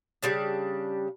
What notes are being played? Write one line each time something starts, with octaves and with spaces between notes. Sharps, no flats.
C#3 G3 D4